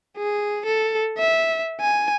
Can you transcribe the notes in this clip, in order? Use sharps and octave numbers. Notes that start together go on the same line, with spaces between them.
G#4
A4
E5
G#5